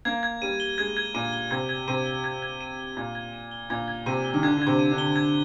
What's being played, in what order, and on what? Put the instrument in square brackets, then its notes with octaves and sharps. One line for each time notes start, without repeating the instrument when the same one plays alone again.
[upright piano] A#3 [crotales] G#6
[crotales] G#6
[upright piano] G3 [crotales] D#7
[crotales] G7
[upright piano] G#3 [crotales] G#6
[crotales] G#6
[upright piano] A#2 [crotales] D#7
[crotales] G7
[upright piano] C3 [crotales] G#6
[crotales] G#6
[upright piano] C3 [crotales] D#7
[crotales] G7
G#6
G#6
D#7
G7
[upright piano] A#2 [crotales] G#6
[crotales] G#6
D#7
G7
[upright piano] A#2 [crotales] G#6
[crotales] G#6
[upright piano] C3 [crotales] D#7
[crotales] G7
[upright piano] D#3
[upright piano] D3 [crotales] G#6
[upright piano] D3 [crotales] G#6
[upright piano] C3
[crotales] D#7
[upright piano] D3
[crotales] G7
G#6